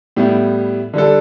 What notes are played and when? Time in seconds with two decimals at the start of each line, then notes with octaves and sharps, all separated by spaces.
0.17 A2 G3 B3 E4
0.93 D3 G3 D4 A4